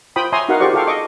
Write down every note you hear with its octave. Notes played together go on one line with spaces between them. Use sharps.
F4 C5 G5 B5 D#6
C#5 E5 G#5 A#5 C6 D#6
D#4 F#4 A#4 F5 F#5
F4 G4 G#4 C5 D5 C#6
F4 G#4 A4 F5 G5 C#6
D#5 C#6 D6